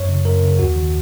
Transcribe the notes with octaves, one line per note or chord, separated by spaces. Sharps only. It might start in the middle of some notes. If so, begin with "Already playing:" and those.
Already playing: F#2 C#5
C#3
F#2 A#4
C#3
D#2 F#4
D#3